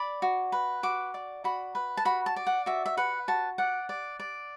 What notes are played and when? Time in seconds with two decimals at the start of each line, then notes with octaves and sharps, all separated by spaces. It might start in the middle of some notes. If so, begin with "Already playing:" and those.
Already playing: D5 B5
0.22 F#4
0.52 B4
0.83 F#4 D6
1.14 D5
1.44 F#4 B5
1.75 B4
1.97 A5
2.05 F#4 B5
2.26 A5
2.36 D5
2.47 F#5
2.66 F#4 E5
2.86 E5
2.97 B4 F#5
3.28 F#4 A5
3.58 D5 F#5
3.89 D5
4.19 D5